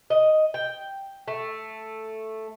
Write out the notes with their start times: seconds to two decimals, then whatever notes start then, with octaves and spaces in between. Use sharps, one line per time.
0.10 D#5
0.54 G5
1.28 A3